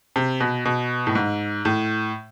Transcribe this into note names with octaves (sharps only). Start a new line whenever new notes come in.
C3
B2
B2
A2
G#2
A2